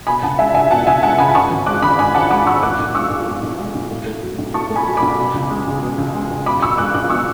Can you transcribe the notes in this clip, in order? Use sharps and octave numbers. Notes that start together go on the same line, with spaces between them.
B2 G#5 B5
C#2 F#5 A5
G#3 E5 G#5
C#2 E5 G#5
B2 F#5 A5
C#2 E5 G#5
G#3 F#5 A5
C#2 G#5 B5
G#2 A5 C#6
G#1
G#3 D6 F#6
G#1 B5 D6
G#2 G#5 B5
G#1 F#5 A5
G#3 B5 D6
G#1 C#6 E6
A2 D6 F#6
B1
G#3 C#6 E6
B1
A2
B1
G#3
B1
A2
A3
F#3
B1
A2 A5 C#6
A3
G#5 B5
F#3
B5 D6
B1
B2
C#2
G#3
C#2
B2
C#2
G#3
C#2
B2 B5 D6
B1 C#6 E6
G#3 D6 F#6
B1 D6 F#6
B2 C#6 E6